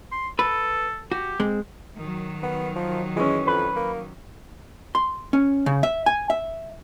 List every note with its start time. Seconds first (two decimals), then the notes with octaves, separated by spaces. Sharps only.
0.12 C6
0.39 A4 B4
1.12 F#4 G4
1.40 G#3 C4
1.97 D#3 F#3
2.43 B3
2.76 F3
3.16 E3 G#3 C#4
3.47 F2 B4
3.76 A#3
4.95 C6
5.33 C#4
5.66 C#3
5.83 E5
6.06 G#5
6.30 E5